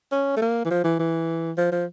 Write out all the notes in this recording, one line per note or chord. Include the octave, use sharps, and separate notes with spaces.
C#4
A3
A#3
E3
F3
E3
E3
F3
F3